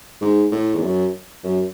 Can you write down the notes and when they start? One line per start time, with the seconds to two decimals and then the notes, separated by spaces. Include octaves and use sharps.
0.21 G#2
0.52 A2
0.75 E2
0.83 F#2
1.44 F#2